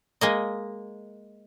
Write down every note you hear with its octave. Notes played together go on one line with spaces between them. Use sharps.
G#3 A#3 D#5